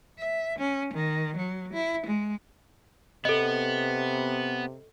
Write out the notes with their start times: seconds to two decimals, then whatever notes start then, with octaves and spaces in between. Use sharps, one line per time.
0.19 E5
0.59 C#4
0.94 D#3
1.37 F#3
1.73 E4
2.07 G#3
3.25 C3 B3 A4 D#5